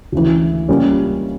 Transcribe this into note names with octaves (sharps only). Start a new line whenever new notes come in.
D2 C#3 E3
C#2 C#3 G3 A#3 C#4